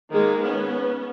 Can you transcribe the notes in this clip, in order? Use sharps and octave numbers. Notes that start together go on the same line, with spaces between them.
D#3 G#3 A#3 G#4
B3 C#4